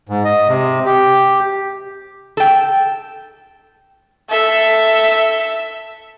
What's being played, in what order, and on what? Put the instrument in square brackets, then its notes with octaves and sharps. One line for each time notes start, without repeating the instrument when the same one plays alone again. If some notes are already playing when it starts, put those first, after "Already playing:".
[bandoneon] G#2
D#5
C3
G4
[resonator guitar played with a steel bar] A4 G5
[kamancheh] A4 E5